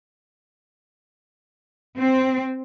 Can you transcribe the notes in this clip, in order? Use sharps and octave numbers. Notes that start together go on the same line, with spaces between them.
C4